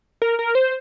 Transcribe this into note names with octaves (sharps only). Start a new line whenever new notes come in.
A#4
A#4
C5